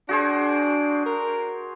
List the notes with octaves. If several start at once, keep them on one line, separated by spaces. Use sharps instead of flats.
D4 F#4 G#4 C5
A#4